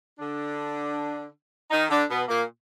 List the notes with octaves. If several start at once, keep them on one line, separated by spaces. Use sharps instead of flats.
D3 D4
D#3 D#4
D3 D4
B2 B3
A#2 A#3